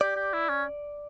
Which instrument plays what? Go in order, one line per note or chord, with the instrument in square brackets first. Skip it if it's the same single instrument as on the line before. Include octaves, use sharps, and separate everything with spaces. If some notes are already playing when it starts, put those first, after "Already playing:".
[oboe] G4 [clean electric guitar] D5
[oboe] G4
E4
C#4